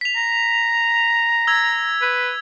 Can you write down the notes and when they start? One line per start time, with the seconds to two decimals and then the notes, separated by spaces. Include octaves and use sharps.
0.01 B6 F7
0.16 A#5
1.47 E6 G#6
2.02 B4